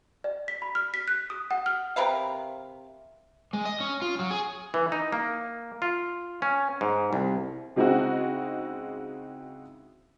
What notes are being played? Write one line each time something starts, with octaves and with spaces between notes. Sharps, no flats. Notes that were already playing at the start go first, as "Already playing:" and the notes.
D5
B6
B5
F6
B6
F#6
D#6
F#5
F6
C3 A#4 B4 F5
G#3
D#5
C#4
F4
F#3
G#4
E3
D#4
A#3
F4
C#4
G#2
C2
C#3 G#3 C4 D#4 E4 F#4